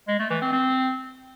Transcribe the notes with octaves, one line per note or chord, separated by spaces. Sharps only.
G#3
A3
E3
C4
C4